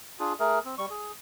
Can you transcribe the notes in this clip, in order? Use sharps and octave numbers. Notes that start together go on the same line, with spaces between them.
D4 F4 G#4
A3 G#4 A#4
C4
G3 C#6
G#4